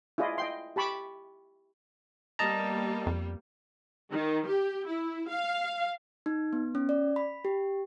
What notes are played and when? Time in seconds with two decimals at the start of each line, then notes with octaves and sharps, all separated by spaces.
0.18 E4 F4 G#4 D5 D#5
0.38 D#5 G5 C6
0.76 G4 A5 B5 C#6 D6
2.39 G3 A#3 B3 D#5 A5 A#5
3.07 F2
4.11 D#3
4.46 G4
4.87 E4
5.29 F5
6.26 D#4
6.53 B3
6.75 C#4
6.89 D5
7.16 B5
7.45 G4